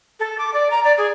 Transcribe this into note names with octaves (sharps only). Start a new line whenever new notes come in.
A4
D6
D5
A#5
D5
G#4